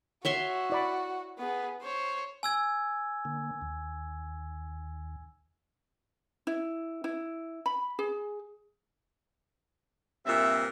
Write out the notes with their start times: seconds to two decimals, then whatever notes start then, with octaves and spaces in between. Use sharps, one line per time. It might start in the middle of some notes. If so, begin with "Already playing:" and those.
0.25 F#4 C#5 E5 C6
0.70 E4 D5 B5
1.38 B3 G#4
1.83 C5 C#5
2.43 G#5 E6 G#6
3.25 D3 A#3
3.62 D#2
6.47 E4
7.04 E4
7.66 B5
7.99 G#4
10.26 G2 A#2 C4 E5